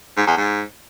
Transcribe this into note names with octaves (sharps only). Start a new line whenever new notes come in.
G#2
E2
G#2